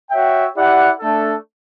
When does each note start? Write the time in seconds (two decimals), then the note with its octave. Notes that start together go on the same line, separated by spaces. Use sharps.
0.10 F#4 C#5 E5 G5
0.55 E4 G4 D5 F#5
0.99 A3 D4 A4